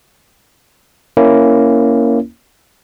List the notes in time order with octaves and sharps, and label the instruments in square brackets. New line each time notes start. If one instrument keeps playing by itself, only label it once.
[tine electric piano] A#3 C#4 E4